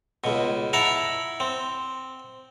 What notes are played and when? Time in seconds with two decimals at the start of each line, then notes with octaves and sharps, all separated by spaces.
0.24 C#2 B2
0.73 E4 F#5 A5 A#5
1.40 C4